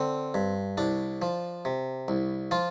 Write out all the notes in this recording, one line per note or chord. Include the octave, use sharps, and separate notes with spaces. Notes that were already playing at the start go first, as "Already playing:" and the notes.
Already playing: D3 C4
G2
C2 D4
F3
C3
C2
F3 F4